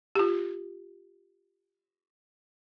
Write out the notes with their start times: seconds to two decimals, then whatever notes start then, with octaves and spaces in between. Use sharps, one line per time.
0.15 F4 G4